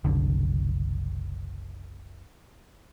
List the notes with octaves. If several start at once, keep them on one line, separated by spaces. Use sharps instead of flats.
F#1 C2 D3